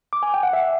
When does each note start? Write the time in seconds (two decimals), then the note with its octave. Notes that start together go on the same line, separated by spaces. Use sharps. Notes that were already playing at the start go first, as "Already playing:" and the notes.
0.13 D6
0.23 G#5
0.34 G5
0.43 F#5
0.53 E5